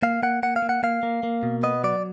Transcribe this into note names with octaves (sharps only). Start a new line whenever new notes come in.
A#3 F5
A#3 F#5
A#3 F#5
F5
A#3
F#5
A#3 F5
A#3
A#3
B2
B3 D#5
F#3 D5